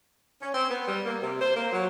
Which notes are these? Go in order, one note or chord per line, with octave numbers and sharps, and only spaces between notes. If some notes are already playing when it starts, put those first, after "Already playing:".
C#4
C4
B3
G3
A#3
C3
C5
A#3
F#3